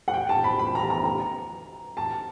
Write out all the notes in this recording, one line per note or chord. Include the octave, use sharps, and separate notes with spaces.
F#5
G5
A5
B5
B5
A#5
A#5
A#5
A5